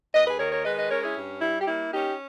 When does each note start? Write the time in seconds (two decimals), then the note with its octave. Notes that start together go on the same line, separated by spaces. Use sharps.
0.14 D#2 B4 D#5
0.27 G#4 B4
0.40 D#3 A#4 C#5
0.52 A#4 C#5
0.65 G#3 B4 D#5
0.78 B4 D#5
0.91 C#4 A#4 C#5
1.04 E4 G#4
1.17 G2
1.41 G3 E4
1.62 G4
1.68 A#3 E4
1.93 C#4 D#4 G4